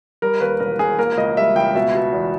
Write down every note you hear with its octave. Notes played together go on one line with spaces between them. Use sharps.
G3 A#4
D#2 B4
E1 A#4
E1 G#4
A#3 A#4
C#2 D#5
G3 E5
C#2 G5
B2 E5
B2
E2